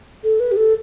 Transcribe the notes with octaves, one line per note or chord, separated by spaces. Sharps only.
A4
B4
G4
A4